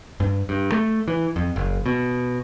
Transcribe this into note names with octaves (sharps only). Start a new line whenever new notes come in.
G2
G2
A3
E3
F2
F#1
B2